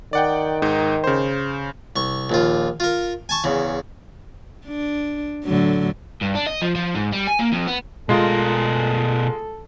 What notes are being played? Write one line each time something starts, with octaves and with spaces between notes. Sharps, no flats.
D#3 D5 F#5 G5
G#2 D#4
C#3 C5
C2 C#6
A#1 D#2 F4
F4 A#4
G#5 A5 C#6
E2 C#3
D4
A2 D3 F#3
G2
D4
D#5
F3
F3
G#2
G3
G#5
A#3
F2
B3
B2 G#3 F4 A4 A#4